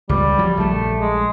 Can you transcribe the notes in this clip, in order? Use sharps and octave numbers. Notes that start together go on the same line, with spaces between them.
C#2 G3
F3 F#3
A#1 G3 A3
G#3